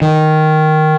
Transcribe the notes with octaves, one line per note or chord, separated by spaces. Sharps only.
D#3